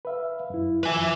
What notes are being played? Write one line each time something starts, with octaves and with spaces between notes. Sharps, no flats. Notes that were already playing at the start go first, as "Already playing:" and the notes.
B4 E5 F5
F#2 E4
F2 F3 B4 E5 G#5